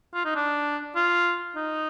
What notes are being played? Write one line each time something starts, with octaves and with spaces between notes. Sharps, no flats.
F4
D#4
D4
F4
D#4